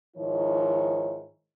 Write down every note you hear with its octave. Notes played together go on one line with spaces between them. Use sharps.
G#2 D#3 F3 E4 C#5